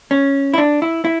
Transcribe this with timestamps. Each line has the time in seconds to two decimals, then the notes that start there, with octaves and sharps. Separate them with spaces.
0.11 C#4
0.54 E4
0.58 D4
0.82 E4
1.05 E4